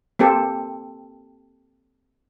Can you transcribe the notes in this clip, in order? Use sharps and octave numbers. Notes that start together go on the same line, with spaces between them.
A#3 C4 G4 A4